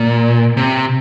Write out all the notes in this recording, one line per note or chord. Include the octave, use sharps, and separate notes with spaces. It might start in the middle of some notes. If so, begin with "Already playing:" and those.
Already playing: A#2
C3